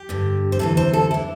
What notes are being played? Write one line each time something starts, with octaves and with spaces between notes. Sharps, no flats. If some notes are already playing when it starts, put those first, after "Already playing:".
Already playing: G4
G2 D3
C5
D2 C3 E3 A4
C5
A4
D3 E4